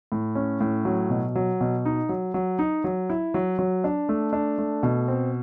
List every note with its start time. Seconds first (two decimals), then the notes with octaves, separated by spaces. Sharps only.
0.12 A2
0.35 C#4
0.61 A2
0.85 F#3
1.10 B2
1.35 F#3
1.61 B2
1.85 D#4
2.09 F#3
2.34 F#3
2.59 D#4
2.84 F#3
3.10 E4
3.34 F#3
3.59 F#3
3.84 D4
4.09 A3
4.33 D4
4.58 A3
4.83 B2
5.08 C4